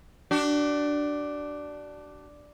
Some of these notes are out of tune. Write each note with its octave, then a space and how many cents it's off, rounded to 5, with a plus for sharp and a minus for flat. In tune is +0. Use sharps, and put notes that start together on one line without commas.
D4 +0 F#4 +45